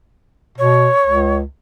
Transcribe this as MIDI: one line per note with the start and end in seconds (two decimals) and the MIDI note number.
0.58 0.89 47
0.58 1.35 73
1.07 1.43 37